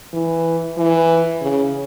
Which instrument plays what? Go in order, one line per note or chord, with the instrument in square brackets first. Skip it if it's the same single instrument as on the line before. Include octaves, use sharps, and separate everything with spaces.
[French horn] E3
E3
C#3